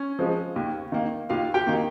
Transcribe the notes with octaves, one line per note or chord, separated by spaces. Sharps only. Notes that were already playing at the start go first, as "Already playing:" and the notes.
Already playing: C#4
F3 G#3
D#2
D#3 A#3
D#2 F4 F5
G4 G5
D#3 A#3